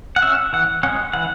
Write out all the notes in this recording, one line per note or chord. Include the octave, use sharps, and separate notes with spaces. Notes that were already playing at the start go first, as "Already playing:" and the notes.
F#5
C#4 E5
E3 F#5
G#3 C#4 F#5
E3 F#5